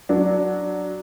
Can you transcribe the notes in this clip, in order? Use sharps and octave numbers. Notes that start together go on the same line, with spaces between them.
F#3 D4